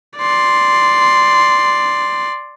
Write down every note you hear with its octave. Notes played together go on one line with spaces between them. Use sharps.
D5 C6